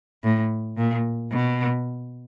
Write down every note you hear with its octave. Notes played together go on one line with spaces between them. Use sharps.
A2
A#2
B2